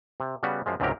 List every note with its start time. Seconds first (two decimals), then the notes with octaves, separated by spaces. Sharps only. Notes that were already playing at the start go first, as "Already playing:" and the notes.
0.20 C3
0.43 C#3 G3 B3 F#4
0.66 F#2 F3 G#3
0.80 C#2 G#2 C3 F#3 G4 A#4